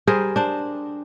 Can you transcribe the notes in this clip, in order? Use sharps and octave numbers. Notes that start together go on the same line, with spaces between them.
G3 G#4 A#4 C5
D4 C5